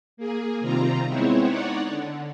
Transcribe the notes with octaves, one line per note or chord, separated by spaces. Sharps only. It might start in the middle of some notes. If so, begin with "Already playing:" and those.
A#3 G#4
C3 D#3 G3 C4 F4 A#5
G#3 B3 C4 E4 C5 C#5
D#4 C#5 D5 F#5
D3